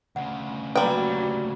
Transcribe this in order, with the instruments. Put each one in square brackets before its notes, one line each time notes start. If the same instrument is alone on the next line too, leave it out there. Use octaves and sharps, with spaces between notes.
[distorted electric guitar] D2 C#3 [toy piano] F#5
[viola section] F#3 A#3 F#4 [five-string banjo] G3 G5 [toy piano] B4 A#5 C6